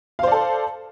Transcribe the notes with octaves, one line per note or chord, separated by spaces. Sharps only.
A4 C5 D5 F5